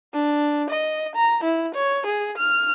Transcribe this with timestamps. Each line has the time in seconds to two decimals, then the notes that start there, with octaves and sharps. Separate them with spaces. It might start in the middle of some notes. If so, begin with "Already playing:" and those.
0.13 D4
0.70 D#5
1.15 A#5
1.43 E4
1.75 C#5
2.06 G#4
2.38 F6